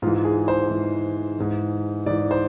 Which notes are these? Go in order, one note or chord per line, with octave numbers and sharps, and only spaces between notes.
G#2 E3 F4
G#4
C5
G#2 E3
G#2 E3
G#2 E3 D5
C5